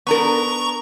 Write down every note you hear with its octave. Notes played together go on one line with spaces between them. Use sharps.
B3 D4 A#4 A#5 C#6